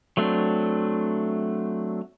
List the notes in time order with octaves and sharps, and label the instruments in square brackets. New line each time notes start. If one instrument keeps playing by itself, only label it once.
[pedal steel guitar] F#3 A3 C4 D4